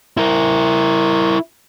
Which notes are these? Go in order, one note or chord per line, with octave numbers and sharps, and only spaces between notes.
E4 A#4